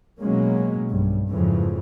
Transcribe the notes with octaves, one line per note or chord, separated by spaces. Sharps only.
B2 F#3 G#3 A#3 C#4
B1 G2
F2 G#2 C#3 E3 F3